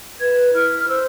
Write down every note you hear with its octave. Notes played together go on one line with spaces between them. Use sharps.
B4 G#6
E4 F6
F6
C5 E6